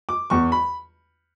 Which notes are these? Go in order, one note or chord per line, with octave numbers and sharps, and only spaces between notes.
D6
E2 C#6
B5